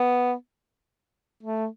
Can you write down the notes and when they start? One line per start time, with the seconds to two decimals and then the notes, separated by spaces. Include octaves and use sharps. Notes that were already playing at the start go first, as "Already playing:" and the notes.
Already playing: B3
1.43 A3